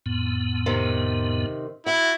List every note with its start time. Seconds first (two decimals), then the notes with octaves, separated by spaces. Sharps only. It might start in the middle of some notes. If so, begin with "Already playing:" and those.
0.06 F2 A2 B3
0.66 C3 D#3
1.86 E4 F#4